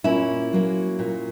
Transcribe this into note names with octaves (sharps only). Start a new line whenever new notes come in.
A#2 C#4 E4
F#3 A#3
A#2